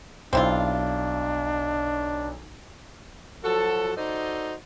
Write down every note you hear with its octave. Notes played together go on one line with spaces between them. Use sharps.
B1 C4 D4 E4 F4
F3 F#3 F#4 A4
D#4 F#4 A4 C5 D5 D#5